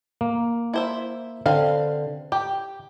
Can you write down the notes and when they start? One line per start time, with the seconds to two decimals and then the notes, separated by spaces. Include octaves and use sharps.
0.21 A#3
0.74 E4 C5 E5
1.46 D3 C4 B4 F5
2.32 G4 G5